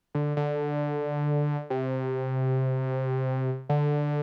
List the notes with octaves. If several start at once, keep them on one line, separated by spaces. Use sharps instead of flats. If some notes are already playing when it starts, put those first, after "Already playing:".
D3
D3
C3
D3